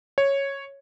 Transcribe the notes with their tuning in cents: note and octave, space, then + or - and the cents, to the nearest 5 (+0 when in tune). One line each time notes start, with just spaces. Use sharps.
C#5 -5